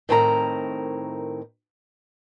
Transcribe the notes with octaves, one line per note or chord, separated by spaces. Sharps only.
A2 D#3 C4 A#4 F#5 A#5